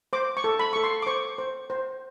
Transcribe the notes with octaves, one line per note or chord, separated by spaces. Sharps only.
C5 D6
C#6
A4
B5
A4 C#6
C6
D6
C5 C#6
C5
C5